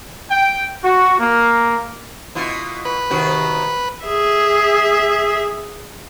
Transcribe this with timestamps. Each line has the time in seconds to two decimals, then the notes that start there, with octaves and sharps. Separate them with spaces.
0.30 G5
0.83 F#4
1.18 A#3
2.35 B2 E4 F4
2.85 B4
3.10 C3 D#3 F#4
4.05 G#4 E5